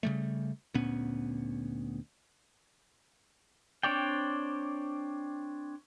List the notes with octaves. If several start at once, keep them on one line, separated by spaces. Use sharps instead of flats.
C#3 G3 A3
D2 A#2 B3 C#4
C4 D4 C#5 D5 G5